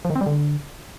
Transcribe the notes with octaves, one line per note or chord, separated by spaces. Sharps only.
F3
D#3
C4
G3
D3